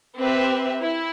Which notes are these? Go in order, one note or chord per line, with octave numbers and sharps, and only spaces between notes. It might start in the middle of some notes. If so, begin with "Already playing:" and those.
C4 G4 B4 E5
E4